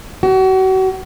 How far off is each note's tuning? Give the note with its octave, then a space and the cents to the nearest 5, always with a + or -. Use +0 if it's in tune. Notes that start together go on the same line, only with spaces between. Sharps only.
F#4 +35